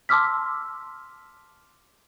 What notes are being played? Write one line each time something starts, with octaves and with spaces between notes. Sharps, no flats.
A5 C6 D6 E6 F6 B6